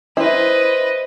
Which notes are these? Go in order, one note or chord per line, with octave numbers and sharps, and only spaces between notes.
E4 B4 C5 D#5